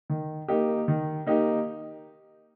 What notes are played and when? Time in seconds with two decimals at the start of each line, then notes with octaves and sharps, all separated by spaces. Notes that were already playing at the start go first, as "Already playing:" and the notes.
0.10 D#3
0.48 A#3 D#4 G4
0.88 D#3
1.27 A#3 D#4 G4